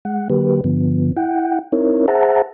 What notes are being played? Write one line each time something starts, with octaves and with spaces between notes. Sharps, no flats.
G#3 F#5
D3 F#3 A#3 G4 B4
G2 D3 F3 B3
E4 F#5 G5
C4 D#4 E4 A#4 C#5
G#4 C5 E5 F#5 A5 A#5